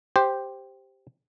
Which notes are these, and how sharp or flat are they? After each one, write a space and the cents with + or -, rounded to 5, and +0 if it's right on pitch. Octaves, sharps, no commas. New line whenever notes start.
G4 +0 C5 +0